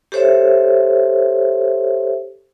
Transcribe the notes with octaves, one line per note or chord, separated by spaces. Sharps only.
G4 A4 C5 C#5 E5